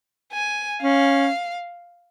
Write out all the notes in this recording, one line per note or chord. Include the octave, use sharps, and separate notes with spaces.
G#5
C#4 F5